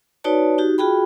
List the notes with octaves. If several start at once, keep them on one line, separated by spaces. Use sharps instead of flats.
D#4 F#4 B4 C#5 D5 A5
D#4 F#4 G4
F4 F#4 G#4 G5 B5